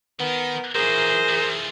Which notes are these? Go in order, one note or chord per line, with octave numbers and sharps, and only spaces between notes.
D#3 B3 D#4 A#4
A#2 E3 F#3 G#4 A#4 C5
A3 F4